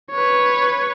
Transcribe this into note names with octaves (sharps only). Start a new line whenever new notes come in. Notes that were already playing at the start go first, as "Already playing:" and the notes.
B4 C#5